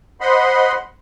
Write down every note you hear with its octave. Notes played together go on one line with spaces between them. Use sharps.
C5 D#5 F#5 B5 C6